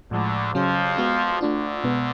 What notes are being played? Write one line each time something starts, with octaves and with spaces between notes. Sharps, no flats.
D2 A2 D3 F3 G#3
F2 C#3 F3 F#3 C#4 G#4
G#3 B3 F#4
D2 D3 A3 D4 F4
B2 G#3 B3